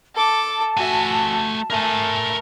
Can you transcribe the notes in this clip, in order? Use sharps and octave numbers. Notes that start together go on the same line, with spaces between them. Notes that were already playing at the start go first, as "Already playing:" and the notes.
A4 A5 D6
A3 F#4 E5 G#5
A3 A#4 G#5